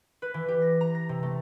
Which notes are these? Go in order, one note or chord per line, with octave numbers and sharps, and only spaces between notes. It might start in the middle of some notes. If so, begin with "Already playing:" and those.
B4
E3
G4
A#6
A#5
A#6
C3
A3